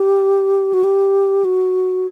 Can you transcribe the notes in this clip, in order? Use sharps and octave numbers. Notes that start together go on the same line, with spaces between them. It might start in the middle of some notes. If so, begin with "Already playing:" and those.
Already playing: G4
F#4
G4
F#4